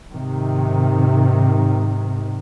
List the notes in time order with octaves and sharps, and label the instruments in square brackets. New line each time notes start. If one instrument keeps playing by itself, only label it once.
[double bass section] G#2 C3 D#3